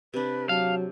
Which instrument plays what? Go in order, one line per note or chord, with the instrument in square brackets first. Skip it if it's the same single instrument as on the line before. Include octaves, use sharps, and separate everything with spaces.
[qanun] C3 D4 [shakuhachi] B4
[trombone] F#3 [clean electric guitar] F5 [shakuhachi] A5